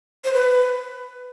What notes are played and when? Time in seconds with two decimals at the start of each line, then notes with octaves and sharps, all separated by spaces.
0.24 C5
0.33 B4